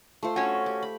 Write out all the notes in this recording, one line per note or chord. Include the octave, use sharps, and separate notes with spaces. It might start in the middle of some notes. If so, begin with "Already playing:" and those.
A3 F4 C5
C#4 F#4
G4
B5